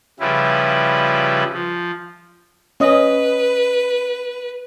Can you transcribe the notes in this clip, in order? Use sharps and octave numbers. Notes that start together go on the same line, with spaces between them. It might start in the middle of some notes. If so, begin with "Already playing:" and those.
C#3 F3 G3 E4 B4
F3
C#4 B4 D#5